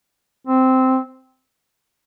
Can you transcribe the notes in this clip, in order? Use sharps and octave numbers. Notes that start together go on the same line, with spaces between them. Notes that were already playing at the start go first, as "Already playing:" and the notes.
C4